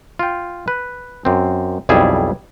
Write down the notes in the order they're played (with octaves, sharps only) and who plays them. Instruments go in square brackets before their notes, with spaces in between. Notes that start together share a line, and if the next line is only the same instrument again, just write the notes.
[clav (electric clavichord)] F4 G5
B4
F#2 C4
B1 F2 G3 E4 G#4 A5